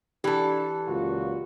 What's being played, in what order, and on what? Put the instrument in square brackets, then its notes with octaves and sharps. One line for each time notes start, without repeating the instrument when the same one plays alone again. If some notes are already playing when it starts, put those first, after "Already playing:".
[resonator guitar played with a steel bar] E3 A4 [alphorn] D4 [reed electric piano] G4
[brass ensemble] C#2 A#2 F#4 [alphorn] F4